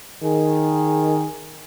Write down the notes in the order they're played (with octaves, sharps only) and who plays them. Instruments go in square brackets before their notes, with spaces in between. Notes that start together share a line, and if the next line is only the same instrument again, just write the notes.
[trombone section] D#3 G#4